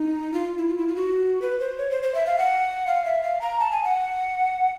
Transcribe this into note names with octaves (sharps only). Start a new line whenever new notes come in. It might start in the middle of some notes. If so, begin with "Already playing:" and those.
Already playing: D#4
F4
E4
F4
E4
F4
F#4
B4
C5
C#5
C5
C5
E5
F5
F#5
F5
E5
F5
A#5
A5
G#5
F#5